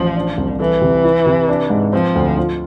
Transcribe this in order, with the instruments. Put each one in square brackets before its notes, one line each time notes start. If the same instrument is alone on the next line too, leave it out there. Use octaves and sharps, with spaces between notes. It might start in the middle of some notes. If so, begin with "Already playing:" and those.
Already playing: [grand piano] A1 [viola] F3
[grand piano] D4
C2
[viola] E3 [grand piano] A4
[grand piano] C3
E4
C3
D4
G#2
[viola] F3 [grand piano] C4
[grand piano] D2
F4